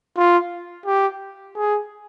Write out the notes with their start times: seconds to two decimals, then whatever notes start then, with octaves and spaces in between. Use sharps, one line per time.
0.17 F4
0.86 G4
1.57 G#4